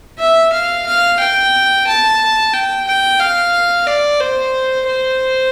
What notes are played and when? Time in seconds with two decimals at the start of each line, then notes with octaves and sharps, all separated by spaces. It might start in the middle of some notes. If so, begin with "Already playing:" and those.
0.19 E5
0.52 F5
0.87 F5
1.20 G5
1.87 A5
2.53 G5
2.87 G5
3.20 F5
3.87 D5
4.20 C5
4.87 C5